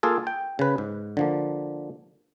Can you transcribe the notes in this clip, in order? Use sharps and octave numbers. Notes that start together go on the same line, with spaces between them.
A#3 F4 G#4 A4
G5
C#3 B4
G#2
D3 F3 A#3